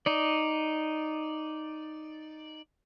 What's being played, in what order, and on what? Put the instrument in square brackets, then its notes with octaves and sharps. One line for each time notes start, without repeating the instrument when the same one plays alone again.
[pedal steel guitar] D#4 D5